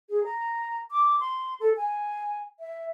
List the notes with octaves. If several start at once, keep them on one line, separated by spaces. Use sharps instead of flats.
G#4
A#5
D6
C6
A4
G#5
E5